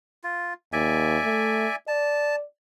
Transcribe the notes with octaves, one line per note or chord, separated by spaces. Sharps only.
F4
D#2 D5 E5 G#5
A3
D5 A5